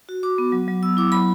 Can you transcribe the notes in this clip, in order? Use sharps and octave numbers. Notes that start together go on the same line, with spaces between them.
F#4
F#4 D6
B3
F#3
F#3
B3 E6
E4 D6
F#3 B5